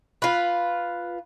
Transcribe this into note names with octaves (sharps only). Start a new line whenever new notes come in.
F4 B4